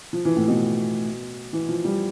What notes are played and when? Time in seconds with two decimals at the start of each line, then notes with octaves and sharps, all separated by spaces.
0.13 F3
0.25 E3
0.37 A2
0.48 B2
1.53 E3
1.69 F3
1.85 G3